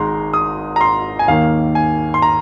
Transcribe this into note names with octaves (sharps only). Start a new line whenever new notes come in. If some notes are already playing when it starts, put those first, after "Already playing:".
Already playing: G#1 G#2 G#3 A#5 C6
D#6
A#5
C6
G#5
D#2 D#3 A#3 F5
G#5
C6
A#5